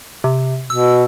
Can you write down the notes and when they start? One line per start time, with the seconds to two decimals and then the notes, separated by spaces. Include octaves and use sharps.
0.24 C3
0.70 B2 E6